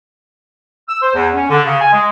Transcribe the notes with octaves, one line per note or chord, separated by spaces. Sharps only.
E6
C5
E2
C#4
D3
C#3
G#5
G#3